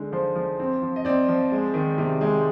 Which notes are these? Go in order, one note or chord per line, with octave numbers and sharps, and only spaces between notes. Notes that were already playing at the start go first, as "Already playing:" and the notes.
Already playing: D3 G#3 D#4
F3 C5
F3
C4
F3
D#5
C4 D5
F3
G#3
D#3
C3
G#3